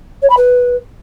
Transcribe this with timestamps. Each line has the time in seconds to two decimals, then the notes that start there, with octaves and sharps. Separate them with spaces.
0.22 C#5
0.29 B5
0.37 B4